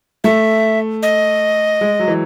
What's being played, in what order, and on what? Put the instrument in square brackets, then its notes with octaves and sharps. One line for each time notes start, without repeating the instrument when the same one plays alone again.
[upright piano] A3 [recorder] E5
[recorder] D#5
[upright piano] G#3
F#3
E3